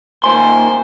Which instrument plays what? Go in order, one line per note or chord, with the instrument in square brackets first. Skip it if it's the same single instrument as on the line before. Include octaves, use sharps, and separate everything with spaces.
[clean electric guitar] D#2 A#2 C6 [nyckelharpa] C5 [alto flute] G#5